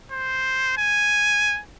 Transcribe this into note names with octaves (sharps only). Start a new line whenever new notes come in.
C5
G#5